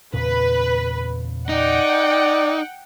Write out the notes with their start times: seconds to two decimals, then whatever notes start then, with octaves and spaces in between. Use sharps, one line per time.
0.13 E2 A#2 C#3 B4
1.49 D#4 D5 F#5 G5